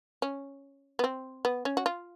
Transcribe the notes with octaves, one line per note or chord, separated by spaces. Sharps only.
C#4
B3
C4
B3
C#4
F#4
F4